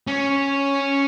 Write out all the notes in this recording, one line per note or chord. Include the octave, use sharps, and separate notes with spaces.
C#4